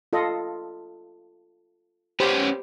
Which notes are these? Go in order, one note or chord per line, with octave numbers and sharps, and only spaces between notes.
F4 A4 D#5
B3 C#4 G4 C5 B5